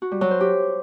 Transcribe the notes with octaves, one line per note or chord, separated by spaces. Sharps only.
F#4
G3
F#3
C5
G4